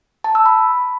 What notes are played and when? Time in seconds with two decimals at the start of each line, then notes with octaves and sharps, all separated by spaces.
0.24 A5
0.35 E6
0.46 B5